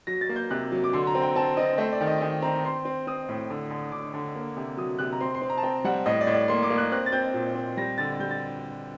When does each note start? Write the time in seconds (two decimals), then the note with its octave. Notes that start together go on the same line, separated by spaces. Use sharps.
0.07 F#3 A#6
0.21 A6
0.29 A#3
0.36 G6
0.50 C3 F#6
0.72 F#3
0.84 D6
0.93 D3 C6
1.07 A#5
1.15 C4
1.22 G5
1.35 C4 A5
1.57 C4 D#5
1.78 A3 C5
1.92 D5
2.01 D#3
2.07 D#5
2.21 D#3 D#5
2.42 C4 A#5
2.64 C4 C6
2.85 C4
3.07 C4 D#6
3.29 A2
3.50 D3
3.71 D3
3.92 D3 D6
4.14 D3
4.35 A#3
4.57 C3
4.77 F#3 D#6
4.99 C3 F#6
5.12 A#5
5.21 C4 C6
5.35 C6
5.41 C4
5.50 A#5
5.58 A5
5.63 C4 G5
5.84 G3 F#5
6.06 A2 D#5
6.21 D5
6.27 A2
6.34 D5
6.48 A#3 C6
6.63 D6
6.70 A#3
6.78 F#6
6.92 C4 F#6
7.06 A6
7.12 C4 G6
7.34 A#2
7.55 C4
7.77 G3 A#6
7.98 D3 A6
8.20 G3 G6
8.31 A6